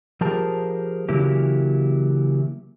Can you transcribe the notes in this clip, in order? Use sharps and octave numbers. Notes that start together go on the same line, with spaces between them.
F3 G4 G#4 A#4 C5 A5
C#3 E3 F#3 A#3 E4 G4